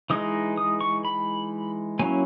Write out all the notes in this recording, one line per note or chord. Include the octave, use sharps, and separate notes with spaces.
E3 G#3 D#4 D#6
D#6
C#6
B5
F#3 A#3 C#4 E4 G#5